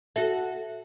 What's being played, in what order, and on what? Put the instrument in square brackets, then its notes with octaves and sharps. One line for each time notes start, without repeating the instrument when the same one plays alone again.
[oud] F#4 A4 [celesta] E5